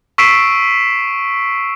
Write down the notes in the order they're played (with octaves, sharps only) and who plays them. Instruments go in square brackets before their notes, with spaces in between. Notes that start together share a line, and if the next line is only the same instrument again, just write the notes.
[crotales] C#6 E6 B6 C7 D7 E7